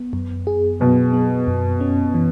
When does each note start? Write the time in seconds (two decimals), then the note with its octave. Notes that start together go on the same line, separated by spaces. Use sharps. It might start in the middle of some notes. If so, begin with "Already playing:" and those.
Already playing: B3
0.13 F#2
0.47 G#4
0.80 B2 F#3
1.13 B3
1.48 F#2
1.81 C#4
2.14 E3